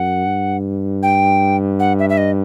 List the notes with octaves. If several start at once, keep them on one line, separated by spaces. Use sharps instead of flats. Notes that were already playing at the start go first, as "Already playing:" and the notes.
Already playing: F#2 F#5
G2
G5
F#5
E5
E5
D#5